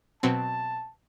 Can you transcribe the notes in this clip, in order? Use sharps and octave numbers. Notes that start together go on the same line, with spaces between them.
B2 F#3 C4 A5